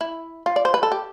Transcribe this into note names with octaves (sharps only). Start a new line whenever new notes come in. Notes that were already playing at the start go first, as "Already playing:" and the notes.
E4
F4
D5
C5
B4
A4
G4